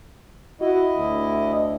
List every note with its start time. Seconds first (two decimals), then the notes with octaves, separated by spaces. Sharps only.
0.61 E4 F#4 D#5
0.97 D2